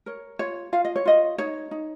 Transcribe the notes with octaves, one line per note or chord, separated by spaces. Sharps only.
A#4 C#5
F4 C#5
F4 F5
D#5
C#5
F4 D#5
D#4 C#5
D#4